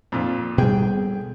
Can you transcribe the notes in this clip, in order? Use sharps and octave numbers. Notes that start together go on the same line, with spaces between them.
F2 A#2
B2 G3 G#4 G5